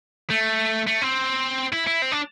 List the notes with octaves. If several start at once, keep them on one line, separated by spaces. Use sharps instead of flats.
A3
A3
C4
E4
E4
C4
D4